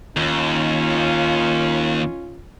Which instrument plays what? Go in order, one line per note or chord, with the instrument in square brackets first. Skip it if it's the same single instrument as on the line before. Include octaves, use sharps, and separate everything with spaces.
[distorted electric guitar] D#2 [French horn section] C#4 D#4 F4